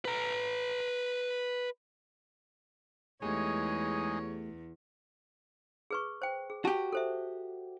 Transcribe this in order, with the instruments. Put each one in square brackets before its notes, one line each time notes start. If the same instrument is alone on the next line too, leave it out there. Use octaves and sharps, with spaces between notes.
[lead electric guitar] B4 A#5
[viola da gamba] E2 [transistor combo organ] G#3 D#4 [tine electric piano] A3 G4 G#4 [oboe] C#5
[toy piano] G#4 B4 C#6
C5 G5
G#4
[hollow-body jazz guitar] F#4 G4 [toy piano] A5
[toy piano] A4 C5 E5